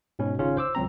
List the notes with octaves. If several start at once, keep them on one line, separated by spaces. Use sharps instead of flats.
G#2 B2 C#4
G#1 C#3 C#4 D#4 F4
C5 D6 E6
C#2 F#3 C4 A#5